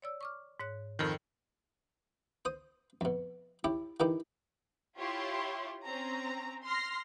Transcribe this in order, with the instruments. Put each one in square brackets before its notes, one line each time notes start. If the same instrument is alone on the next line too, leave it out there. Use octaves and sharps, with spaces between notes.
[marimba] C#5 D5 E6
C#6 D6 F6
G#2 C#5 F#6
[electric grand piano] F2 D#3 [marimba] A4 A#4 G5
[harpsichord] C5 D#6
F2 B2
E4 G4 C#5
D#3 E3 D#4 E4 G4
[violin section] E4 F4 G4 C#5 C6
C4 C#4 A#5
C6 F6 A#6 C7